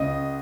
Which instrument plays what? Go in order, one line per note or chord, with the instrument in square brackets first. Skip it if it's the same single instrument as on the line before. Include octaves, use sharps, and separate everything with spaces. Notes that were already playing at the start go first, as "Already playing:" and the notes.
Already playing: [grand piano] C#2 D#5